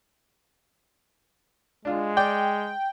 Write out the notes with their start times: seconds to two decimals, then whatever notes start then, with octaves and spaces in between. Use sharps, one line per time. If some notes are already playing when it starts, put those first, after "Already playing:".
1.85 G#3 D4 F4
2.17 D5 G5